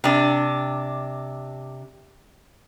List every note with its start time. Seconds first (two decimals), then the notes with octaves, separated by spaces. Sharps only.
0.04 C3 D4